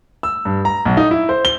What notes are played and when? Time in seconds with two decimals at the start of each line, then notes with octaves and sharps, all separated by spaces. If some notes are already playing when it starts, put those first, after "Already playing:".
0.23 E6
0.45 G2
0.65 A#5
0.85 B1
0.97 D#4
1.11 E4
1.29 C5
1.45 G7